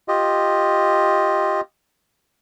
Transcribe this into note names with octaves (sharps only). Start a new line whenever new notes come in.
F4 G4 D#5